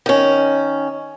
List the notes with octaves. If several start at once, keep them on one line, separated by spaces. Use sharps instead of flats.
D#3 C#4